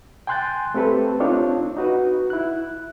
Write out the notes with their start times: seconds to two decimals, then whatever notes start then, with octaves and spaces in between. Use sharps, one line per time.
0.27 G5 G#5 C6 F#6 G6 A6
0.74 A3 C4 G4 A4 B4
1.20 C4 D4 D#4 F4 C#5
1.77 D#4 F#4 B4
2.30 E4 F#6